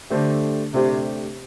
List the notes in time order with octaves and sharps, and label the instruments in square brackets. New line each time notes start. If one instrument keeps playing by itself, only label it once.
[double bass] D3 [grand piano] A3 D4 G4 C5
[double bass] C3 [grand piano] A3 D4 G4 C5